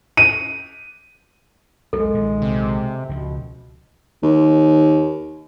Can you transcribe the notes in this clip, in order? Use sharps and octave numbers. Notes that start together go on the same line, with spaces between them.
D#7
B1 E2 G#3 A4
B1 A#2 D#3
C3
C#2 B2 F3
D#2